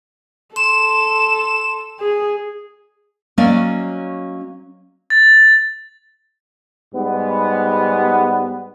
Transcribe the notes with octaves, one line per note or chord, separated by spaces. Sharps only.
A4 C6 E7
G#4
F#3 A#3 C#4 D5 D#5
A6
G#2 G3 B3